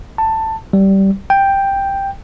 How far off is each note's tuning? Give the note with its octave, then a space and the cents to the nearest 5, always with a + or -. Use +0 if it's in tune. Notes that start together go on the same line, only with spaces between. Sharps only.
A5 +15
G3 -15
G5 +5